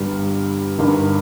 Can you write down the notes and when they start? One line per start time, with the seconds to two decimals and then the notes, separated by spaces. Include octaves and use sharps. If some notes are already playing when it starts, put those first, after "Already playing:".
Already playing: G1 G2 G3
0.78 G1 G2 D#3